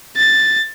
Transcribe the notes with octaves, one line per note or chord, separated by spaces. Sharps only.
A6